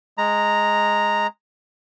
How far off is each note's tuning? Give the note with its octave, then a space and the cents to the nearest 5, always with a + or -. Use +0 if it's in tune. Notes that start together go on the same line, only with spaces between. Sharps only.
G#3 +0 A#5 -5